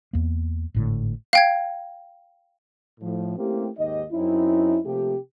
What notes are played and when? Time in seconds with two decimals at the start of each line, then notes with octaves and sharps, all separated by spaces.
0.13 E2 A#3
0.74 G#1 A2 D3
1.33 F5 G5 G#6
3.00 A2 F3
3.37 A3 A#3 C4 C#4 E4 G4
3.77 D#2 G#2 D#4 G4 D#5
4.12 F#2 C4 C#4 D#4 E4
4.84 C3 F3 A3 A#3 G4